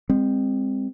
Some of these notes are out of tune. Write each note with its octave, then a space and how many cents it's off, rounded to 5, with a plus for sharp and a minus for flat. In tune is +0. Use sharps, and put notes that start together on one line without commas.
G#3 -35 C4 +0